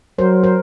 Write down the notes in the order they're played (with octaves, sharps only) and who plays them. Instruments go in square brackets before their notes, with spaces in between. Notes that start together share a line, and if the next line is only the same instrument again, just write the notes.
[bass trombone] F#3 [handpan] A#4 C5
[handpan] A#4 C5